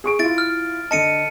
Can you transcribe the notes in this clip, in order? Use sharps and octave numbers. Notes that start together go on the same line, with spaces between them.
G#4 C#6 D7
E4 F4 A6 D7
F6
D3 D#5 A5 C#7 D#7